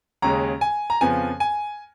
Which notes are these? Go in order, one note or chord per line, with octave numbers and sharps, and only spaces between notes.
D#2 C#3 G#3 A#5
G#5
A#5
F2 C#3 F3 B3 G#5
G#5